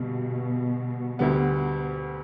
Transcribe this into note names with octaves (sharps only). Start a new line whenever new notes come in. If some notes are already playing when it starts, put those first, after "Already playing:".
Already playing: G2 B2 D3 G3
D2 D3 G3 B3